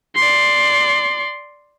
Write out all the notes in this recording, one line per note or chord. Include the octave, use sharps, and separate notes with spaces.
D5 C6